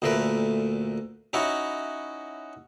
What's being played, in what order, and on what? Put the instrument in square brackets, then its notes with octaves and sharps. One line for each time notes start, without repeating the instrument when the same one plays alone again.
[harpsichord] D2 A#2 A3 A#4 B4
C#4 D#4 E4 F#4 C#5